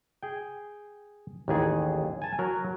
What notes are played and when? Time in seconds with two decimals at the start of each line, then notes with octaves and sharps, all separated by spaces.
0.23 G#4 G5
1.48 A1 D#2 G#4
2.22 G#5 A5
2.39 F#3 A#4